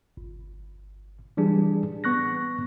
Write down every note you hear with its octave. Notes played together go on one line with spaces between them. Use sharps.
G1
E3 G3 D4 G#4
B3 C#6 F#6 A#6